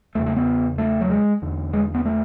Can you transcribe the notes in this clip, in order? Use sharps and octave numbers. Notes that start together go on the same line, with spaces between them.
E2 C#3 A3
A3
B3
A3
F#3
G#3
E2 D3
G#3
B3
A3